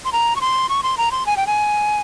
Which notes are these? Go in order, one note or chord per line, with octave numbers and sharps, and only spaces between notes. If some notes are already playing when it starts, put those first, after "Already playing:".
C6
A#5
C#6
C6
C#6
C6
A#5
C6
G#5
G5
G#5